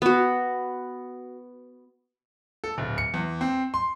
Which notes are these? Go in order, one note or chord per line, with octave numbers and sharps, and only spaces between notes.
B3 F#4
A4
D1
C#7
E2
C4
C6